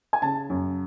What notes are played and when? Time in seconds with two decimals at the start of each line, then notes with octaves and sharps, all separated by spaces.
0.13 G#5
0.22 C#3 A5
0.50 F#2